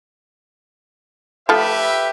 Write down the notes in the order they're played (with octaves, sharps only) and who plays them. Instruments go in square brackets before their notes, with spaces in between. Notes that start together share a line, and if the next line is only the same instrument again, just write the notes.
[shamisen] F3 A3 [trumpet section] G4 B4 E5